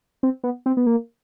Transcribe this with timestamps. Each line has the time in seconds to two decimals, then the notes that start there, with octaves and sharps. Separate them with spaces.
0.23 C4
0.44 B3
0.66 C4
0.77 B3
0.86 A#3